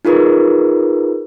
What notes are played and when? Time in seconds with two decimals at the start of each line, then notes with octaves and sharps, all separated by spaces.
0.05 D#4 F4 G#4 A#4 B4